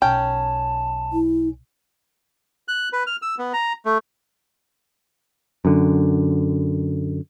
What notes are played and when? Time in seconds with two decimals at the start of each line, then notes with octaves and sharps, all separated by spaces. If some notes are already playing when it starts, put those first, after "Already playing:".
0.02 B1 C#4 G5 A5
1.13 E4
2.68 F#6
2.93 B4
3.07 F6
3.22 E6
3.38 B3
3.53 A#5
3.85 A3
5.65 F#2 D3